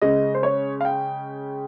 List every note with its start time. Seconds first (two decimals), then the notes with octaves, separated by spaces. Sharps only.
0.02 C#3 G#3 D#5
0.35 C5
0.43 C#5
0.81 F5
0.85 G5